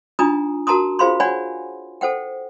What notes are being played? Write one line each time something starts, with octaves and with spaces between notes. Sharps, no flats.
D4 D#4 F4 G#5 A#5 D#6
F#4 A#4 A5 A#5 C6 D#6
F4 G#4 C5 F5 B5 C6
C#5 D5 F#5 G#5 B5
A4 C5 F#5 G5